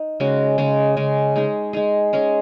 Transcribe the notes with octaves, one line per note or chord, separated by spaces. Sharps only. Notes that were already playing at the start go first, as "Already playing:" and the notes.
Already playing: D#4
C#3 G#3 C#4 F#4
C#3 G#3 C#4
C#3 G#3 C#4
G#3 D#4 G#4
G#3 D#4 G#4
G#3 C#4 G#4